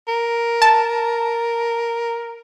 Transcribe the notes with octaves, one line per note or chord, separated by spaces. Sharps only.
A#4
A5